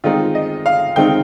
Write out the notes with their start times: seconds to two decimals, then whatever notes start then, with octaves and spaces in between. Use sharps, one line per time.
0.04 D#3 G#3 C4 D#4 F4
0.35 D#5
0.66 F5
0.96 D#3 G#3 C4 D#4 G5